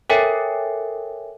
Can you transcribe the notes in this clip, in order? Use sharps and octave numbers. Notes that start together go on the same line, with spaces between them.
A4 A#4 C#5 E5 G5 G#5